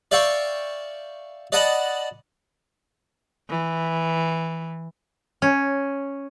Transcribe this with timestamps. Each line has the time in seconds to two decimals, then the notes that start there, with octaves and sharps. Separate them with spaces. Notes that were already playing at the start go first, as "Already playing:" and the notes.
0.11 D5 E5 F5 G5 C#6
1.52 D5 D#5 F#5 A5 B5
3.49 E3
5.42 C#4